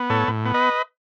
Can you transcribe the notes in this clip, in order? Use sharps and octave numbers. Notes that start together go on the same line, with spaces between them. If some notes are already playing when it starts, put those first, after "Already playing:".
Already playing: B3
A2 A4 C#5
A2
B3
B4 D#5